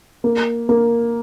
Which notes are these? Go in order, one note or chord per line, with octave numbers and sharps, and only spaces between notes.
A#3
A#3